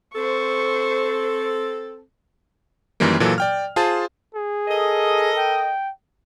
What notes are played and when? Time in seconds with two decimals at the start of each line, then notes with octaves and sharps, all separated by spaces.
0.15 C4 A4 C5 C#6
3.00 F#2 D#3 E3 G3 A#3
3.20 A#2 E3 F#3 A4
3.38 D5 G5 F6
3.76 F4 G#4 C5 A5
4.35 G#4
4.68 A4 A#4 D#5
5.37 G5